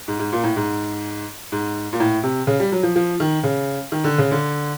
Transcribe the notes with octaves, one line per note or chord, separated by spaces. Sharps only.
G#2
G#2
A#2
A2
G#2
G#2
A#2
A2
C3
C#3
G3
F#3
F3
F3
D#3
C#3
D#3
D3
C#3
D3